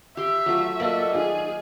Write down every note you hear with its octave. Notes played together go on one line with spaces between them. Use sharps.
G4 E5 G5 C6
F#3 A3 F4
A#3 F4 A4 D5 D#5 F#5
D#3 F4 G#4